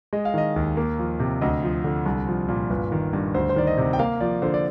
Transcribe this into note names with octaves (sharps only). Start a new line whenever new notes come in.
G#3 D#5
F5
D#3 D#5
D#2
A#3
F3
C3
D2 D#5
F3
D3
C2
F3
A#2
G1
D#3
G2
D2 C5
C5
D#3 D5
D#5
C3
G5
A#3 F5
F3 D5
D3 C5
D5